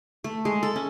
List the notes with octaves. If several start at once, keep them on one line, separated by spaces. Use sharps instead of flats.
A3
G#3
A4
C#4